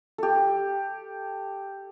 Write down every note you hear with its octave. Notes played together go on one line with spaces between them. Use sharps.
G4 A4